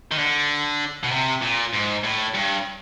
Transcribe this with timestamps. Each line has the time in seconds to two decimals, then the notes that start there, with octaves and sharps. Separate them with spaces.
0.11 D#3
0.18 D3
1.03 B2
1.11 C3
1.42 A#2
1.73 G#2
2.04 A2
2.34 G2